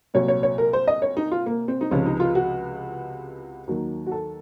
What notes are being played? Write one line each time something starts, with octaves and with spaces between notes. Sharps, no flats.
C2 A#2 F#3 C#5
C#5
C#5
A#4
C5
D#5
C#5
D#4
F4
A#3
C4
D#4
C#2 C3 F3 C#4
D#4
F4
F#4
D#2 D#3 F#3
F#4
A4